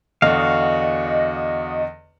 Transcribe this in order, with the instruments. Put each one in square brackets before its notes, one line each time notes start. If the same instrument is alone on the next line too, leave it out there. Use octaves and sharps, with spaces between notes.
[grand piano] E2 D3 [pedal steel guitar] F#4 F5 [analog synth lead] D#5